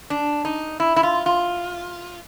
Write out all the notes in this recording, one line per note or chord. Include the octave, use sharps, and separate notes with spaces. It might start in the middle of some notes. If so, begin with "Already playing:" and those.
D4
D#4
E4
E4
F4
F4